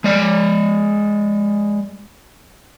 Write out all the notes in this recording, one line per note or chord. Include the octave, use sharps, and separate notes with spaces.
G#3 D5